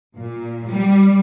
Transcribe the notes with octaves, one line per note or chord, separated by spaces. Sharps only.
A#2
G3